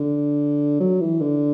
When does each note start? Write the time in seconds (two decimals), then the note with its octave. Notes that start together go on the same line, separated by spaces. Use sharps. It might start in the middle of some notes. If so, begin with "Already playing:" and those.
Already playing: D3
0.80 F#3
1.01 E3
1.21 D3